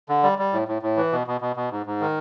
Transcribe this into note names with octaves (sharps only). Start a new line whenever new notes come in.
D3
G3
G3
A2
A2
A2
E3
B2
B2
B2
B2
G#2
G#2
D#3